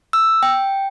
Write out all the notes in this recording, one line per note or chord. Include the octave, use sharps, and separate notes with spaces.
E6
G5